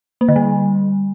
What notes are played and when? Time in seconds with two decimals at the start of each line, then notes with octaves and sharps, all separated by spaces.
0.21 A#3
0.28 D3
0.36 G3